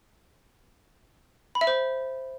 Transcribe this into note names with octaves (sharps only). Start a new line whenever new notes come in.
B5
E5
C5